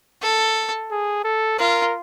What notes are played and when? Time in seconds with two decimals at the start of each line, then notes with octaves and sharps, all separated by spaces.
0.22 A4
0.91 G#4
1.24 A4
1.59 F4 A#4